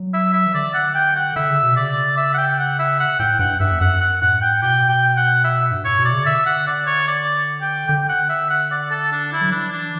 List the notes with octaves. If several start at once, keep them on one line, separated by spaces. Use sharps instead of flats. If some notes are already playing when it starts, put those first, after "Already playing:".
Already playing: F#3
E5
E5
E3
D3 D5
F#5
G5
F#5
D3 E5
C#3
B2
C#3 D5
E5
F#5
G5
F#5
E5
F#5
A2 G5
G2 F#5
G2 E5
E2
F#2 F#5
F#5
A2 F#5
G5
B2 G5
G5
F#5
E5
G2
A2 C#5
B2
D5
C#3
D3 E5
F#5
D5
C#5
D5
G5
D3 G5
F#5
E5
F#5
D5
A4
D4
E4
F#3
E3 D4
D4